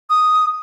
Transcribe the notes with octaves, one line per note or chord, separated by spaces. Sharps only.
D#6